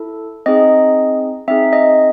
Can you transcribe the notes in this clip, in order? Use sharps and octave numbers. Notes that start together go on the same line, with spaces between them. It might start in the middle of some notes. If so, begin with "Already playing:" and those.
Already playing: E4 A4
C4 D#4 G#4 D#5
C4 D#4 G#4 E5
D#5